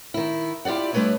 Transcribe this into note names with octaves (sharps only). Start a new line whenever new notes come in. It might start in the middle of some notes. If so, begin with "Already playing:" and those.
D#3 E4
E4 F4 G4 D5 F#5
G3 A3 D4 B4 C#5 D#5